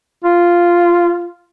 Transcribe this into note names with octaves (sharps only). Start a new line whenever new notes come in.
F4